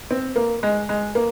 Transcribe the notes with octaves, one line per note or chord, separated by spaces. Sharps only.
C4
A#3
G#3
G#3
A#3